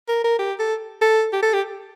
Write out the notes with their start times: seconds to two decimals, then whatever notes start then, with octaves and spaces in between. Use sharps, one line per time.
0.08 A#4
0.24 A#4
0.39 G4
0.60 A4
1.02 A4
1.33 G4
1.43 A4
1.53 G4